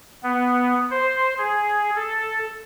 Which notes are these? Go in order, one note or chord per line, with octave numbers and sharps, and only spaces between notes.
B3
C5
G#4
A4